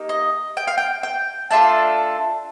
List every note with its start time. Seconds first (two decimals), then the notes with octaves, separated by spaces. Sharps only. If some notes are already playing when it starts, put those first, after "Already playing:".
Already playing: A#3 D#4 G4
0.09 D#5
0.57 G5
0.67 F5
0.78 G5
1.03 G5
1.51 A3 D4 F4 A4 A5